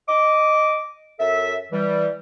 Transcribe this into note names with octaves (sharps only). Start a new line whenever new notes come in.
D#5 D6
F#2 A4 E5
E3 G3